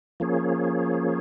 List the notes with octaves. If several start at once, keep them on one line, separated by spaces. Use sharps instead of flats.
F3 A#3 C#4 G#4